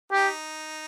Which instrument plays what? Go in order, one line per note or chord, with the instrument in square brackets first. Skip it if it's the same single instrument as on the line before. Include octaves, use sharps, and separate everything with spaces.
[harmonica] D#4 [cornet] G4